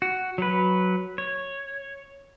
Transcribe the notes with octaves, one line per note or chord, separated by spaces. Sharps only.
F#4
F#3 B4
C#5